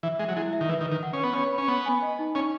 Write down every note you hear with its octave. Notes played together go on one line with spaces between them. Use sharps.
E3 E5
G#3 E5
F#3
G#3 E4
E5
D#3
E3 B4
D#3
B4
D#3
F#5
C#4
B3 B4
C#4 C#5
B5
C#4
B3 B5
G#5
D#5
D#4
C#4 D#4